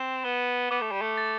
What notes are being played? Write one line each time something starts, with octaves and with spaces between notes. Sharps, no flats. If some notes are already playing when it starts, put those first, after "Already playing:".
Already playing: C4 E7
B3 G7
B3 D6
A3
G3
A3
A6